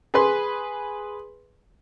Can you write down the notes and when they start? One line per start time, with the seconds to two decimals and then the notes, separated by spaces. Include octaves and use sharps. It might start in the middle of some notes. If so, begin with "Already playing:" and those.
0.14 G#4 B4 C6